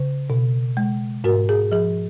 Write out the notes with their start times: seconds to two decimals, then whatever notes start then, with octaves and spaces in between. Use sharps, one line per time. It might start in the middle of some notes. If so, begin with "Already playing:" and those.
Already playing: C#3
0.30 B2
0.77 G#3
1.24 G#2 F#4 A#4
1.49 G#4
1.72 F3 G#4